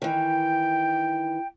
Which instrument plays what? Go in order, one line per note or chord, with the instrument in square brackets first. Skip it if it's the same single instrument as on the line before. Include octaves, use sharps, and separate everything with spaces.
[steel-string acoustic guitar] D#3 E3 [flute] G5